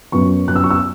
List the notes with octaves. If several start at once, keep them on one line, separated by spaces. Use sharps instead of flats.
F#2 F#3 B3 C#6
F#2 F#3 B3 F#6
E6
C#6
E6